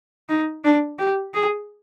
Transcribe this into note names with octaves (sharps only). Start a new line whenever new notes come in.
D#4
D4
G4
G#4